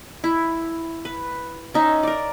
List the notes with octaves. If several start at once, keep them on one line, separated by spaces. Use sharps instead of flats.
E4
B4
C#4 D#4 E5
A#4 D5